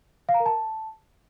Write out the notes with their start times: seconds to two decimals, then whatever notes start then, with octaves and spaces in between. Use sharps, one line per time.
0.29 F5
0.34 A#5
0.40 A#4
0.46 A5